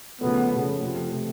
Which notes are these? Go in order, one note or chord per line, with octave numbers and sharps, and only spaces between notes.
C#3 F3 A3 B3
C#3 F3 A3
C3 F3 A3
C3 F3 A3